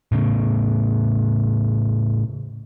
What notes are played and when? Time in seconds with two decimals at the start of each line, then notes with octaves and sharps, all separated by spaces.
0.12 A2 C#3